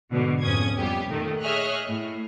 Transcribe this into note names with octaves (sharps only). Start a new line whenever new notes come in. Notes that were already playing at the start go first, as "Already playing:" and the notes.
G#2 B2 D3
F2 G#2 C#4 D#6 G#6
F2 G3 B3 G4
A#2 D#3 A3
G#4 C#5 D#5 E5 F6 F#6
A2